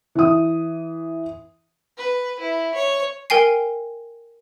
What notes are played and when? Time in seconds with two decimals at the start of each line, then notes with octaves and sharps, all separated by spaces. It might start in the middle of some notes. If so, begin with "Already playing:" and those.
0.15 E3 D#6
1.97 B4
2.40 E4
2.75 C#5
3.30 A#4 G5 G#5 C7